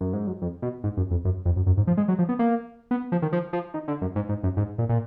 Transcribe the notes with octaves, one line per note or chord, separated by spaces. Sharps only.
F#2
G#2
F#2
F2
B2
G#2
F#2
F2
F#2
F2
F#2
F#2
G#2
F3
G#3
F#3
F3
B3
A#3
B3
F3
D#3
F3
F3
D#3
D3
F#2
G#2
G#2
F#2
G#2
A#2
A#2